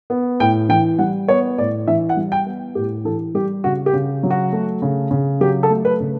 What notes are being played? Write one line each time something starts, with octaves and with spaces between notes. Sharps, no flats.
B3
A2 G5
E3 G5
G3 F#5
B3 C#5
A2 D5
E3 E5
F#5
G3
G5
B3
A2 G4
E3 A4
G3 G4
C#3 F#4
G4
C#3
F#3
F#4
A3
C#3
C#3
F#3 G4
A4
A3
B4
C#3